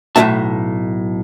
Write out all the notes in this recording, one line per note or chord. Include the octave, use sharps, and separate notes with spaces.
B1 A2 F3 C#4 E5 A5